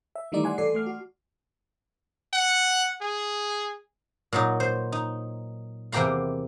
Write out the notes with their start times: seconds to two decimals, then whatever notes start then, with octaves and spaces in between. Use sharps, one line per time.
0.15 E5
0.32 D#3 E3 G3 A3 D#4 D5
0.44 D5 F#5 G#5 C6
0.58 E3 A4 D5 C7
0.74 A3 D6 F6
0.86 F#4
2.33 F#5
3.01 G#4
4.33 A#2 F#3 D#4
4.60 C5
4.92 D#4
5.92 E2 C3 A#3 G4 A#5 C6